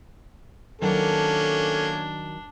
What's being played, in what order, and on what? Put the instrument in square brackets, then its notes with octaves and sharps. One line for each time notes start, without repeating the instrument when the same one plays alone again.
[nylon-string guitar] D#3 F#3 F#5 [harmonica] A#3 C#4 [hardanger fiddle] D4 [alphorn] A4